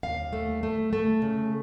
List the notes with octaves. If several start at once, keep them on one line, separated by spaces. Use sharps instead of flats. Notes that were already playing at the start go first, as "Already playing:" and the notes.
D#2 F5
A3
A3
A3
C#3